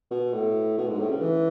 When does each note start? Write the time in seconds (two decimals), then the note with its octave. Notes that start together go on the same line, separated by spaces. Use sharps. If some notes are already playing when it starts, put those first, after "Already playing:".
0.11 B2
0.34 A2
0.78 B2
0.88 G#2
0.99 A2
1.10 C#3
1.21 E3